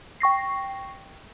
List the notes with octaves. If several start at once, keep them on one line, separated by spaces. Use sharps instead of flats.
G5 C#6 A#6 C7